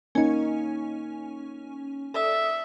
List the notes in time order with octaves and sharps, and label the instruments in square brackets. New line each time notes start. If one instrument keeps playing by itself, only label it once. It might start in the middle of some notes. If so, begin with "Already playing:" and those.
[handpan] A#3 D#4 [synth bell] C#4 G#5
[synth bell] A4 D5 D#6 [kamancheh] E5